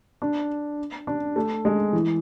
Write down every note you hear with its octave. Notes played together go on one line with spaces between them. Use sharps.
D4
D4
A3
G#3
E3